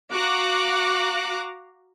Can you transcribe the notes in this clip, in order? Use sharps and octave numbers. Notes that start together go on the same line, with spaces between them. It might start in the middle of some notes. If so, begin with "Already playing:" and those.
F#4 F5 A#5 D6 F#6